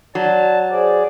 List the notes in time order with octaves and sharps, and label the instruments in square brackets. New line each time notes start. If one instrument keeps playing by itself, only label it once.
[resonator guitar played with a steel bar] F#3 [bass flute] D5 [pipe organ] A5
[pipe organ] G#4 D5 [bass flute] C5